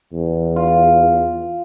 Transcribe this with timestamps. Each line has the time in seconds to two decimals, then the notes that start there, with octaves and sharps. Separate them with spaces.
0.13 E2
0.56 F4